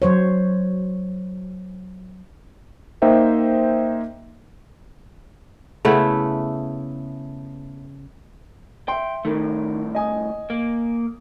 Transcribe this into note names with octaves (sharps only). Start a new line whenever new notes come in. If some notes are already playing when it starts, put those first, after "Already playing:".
F#3 C5 C#5
A#3 D#4 C5 E5 G5
C#3 A3 B3 E4
E5 G5 C6
C2 A2 D#3 A3
D#5 G#5 D#6
A#3